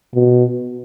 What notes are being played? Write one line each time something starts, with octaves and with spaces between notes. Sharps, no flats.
B2